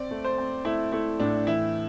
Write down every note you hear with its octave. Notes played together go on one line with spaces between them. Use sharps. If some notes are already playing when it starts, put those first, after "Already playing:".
Already playing: C4 D5
A3
C5
C4
A3 E4
A3 E4
A2 D4
E3 E4